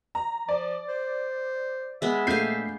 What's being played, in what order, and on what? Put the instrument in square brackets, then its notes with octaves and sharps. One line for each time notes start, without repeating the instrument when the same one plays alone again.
[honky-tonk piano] A#5
[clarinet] F3 [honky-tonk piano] D5
[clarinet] C5
[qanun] G#3 B3 [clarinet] E5
[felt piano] A#1 A3 [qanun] F5 G#5 [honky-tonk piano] G6 C7